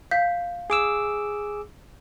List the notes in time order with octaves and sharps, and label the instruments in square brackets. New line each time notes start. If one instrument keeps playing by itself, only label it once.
[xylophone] F5 G6 B6
[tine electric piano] G#4 D6 E6